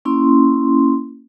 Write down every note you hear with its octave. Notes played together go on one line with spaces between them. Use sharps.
A#3 C#4 E4 C6